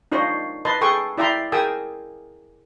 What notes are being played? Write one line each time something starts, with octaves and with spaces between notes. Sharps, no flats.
D4 D#4 F4 C5 C#5 D#5
B4 D#5 A5 C6
G#4 A4 G5 C6 C#6 D#6
E4 D5 E5 G5 A#5 C6
G#4 A#4 G5 G#5 D#6 E6